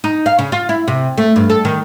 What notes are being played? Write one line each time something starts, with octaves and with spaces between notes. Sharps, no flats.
D#4
F5
C#3
F4
E4
C3
A3
G2
A4
D#3